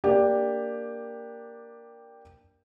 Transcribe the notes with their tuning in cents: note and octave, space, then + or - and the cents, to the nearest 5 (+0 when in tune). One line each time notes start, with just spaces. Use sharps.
A#3 +0 D4 +0 G4 +10